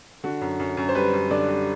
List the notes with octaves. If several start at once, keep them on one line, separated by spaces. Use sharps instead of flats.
D3 F#4
F#2
F#2
F#2
C5
G3 B4
F#2
D3 D5
G3